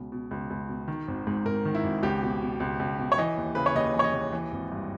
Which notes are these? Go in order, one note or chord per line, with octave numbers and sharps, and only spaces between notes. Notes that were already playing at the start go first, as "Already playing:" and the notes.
Already playing: C#2 B2
B2
C#2
C#2
B2
D#3
G#1
G#2
G#1 A#4
D#3
E4
G#1
C#2 G4
B2
B2
C#2
C#2
B2
C#5
E3 D#5
D#2
C#3 B4
C#5
D#2 D#5
E3
C#5
D#5
D#2
E3
G#1
G2